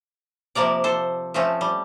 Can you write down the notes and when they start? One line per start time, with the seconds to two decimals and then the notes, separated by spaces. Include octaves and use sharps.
0.55 C3 F3 A#3 A#4 D5
0.84 A4 C5
1.34 F3 A3 C4 C#4
1.61 G3